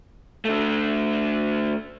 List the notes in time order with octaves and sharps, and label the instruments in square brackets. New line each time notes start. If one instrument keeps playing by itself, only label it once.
[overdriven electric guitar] D3 A3